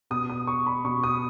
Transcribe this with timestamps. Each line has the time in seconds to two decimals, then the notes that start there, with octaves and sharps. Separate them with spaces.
0.11 B2 D#6
0.30 D#6
0.47 C#6
0.66 B5
0.84 B2 C#6
1.03 D#6